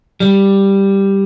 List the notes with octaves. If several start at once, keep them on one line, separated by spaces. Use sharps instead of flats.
G3